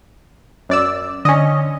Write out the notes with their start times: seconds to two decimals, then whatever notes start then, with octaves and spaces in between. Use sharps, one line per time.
0.69 F#2 D5 E6
1.25 D3 C#4 D#5